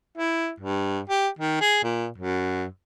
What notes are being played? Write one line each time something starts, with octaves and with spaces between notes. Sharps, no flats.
E4
G2
G4
D#3
G#4
A#2
F#2